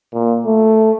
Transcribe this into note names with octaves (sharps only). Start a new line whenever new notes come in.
A#2
A3